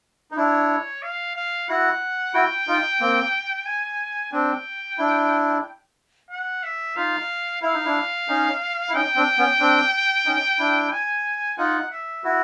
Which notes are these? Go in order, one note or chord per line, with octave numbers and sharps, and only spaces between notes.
D#4
D4 E4 C#5
F5
F5
E4 F#4 F#5
E4 F#4 G5
D#4 F4
A#3 C4
G#5
C4 D4 G5
D4 E4
F#5
E5
D#4 F4 F5
E4 F5
D#4
D4 E4
C#4 D#4
E4
C#4 D#4 G5
C4 D4
B3 C#4
C4 D4
C#4 D#4
D4 E4
G#5
D#4 F4 F#5
E5
E4 F#4